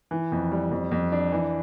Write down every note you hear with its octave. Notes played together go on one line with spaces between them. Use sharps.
E3
F2
G3
F2
F2
D4
E3